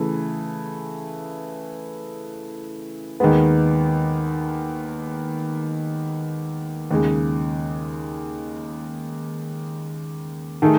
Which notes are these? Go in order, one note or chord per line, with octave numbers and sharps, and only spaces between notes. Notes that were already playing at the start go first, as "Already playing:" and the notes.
Already playing: C#3 E3 A3
D#2 D#3 G#3 B3
D#2 C#3 G#3
D#3 A3 D#4 G#4